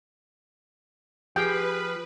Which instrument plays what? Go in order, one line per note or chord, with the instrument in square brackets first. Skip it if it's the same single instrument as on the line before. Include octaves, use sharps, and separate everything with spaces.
[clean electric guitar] F3 [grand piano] G4 G#4 [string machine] B4 [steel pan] G5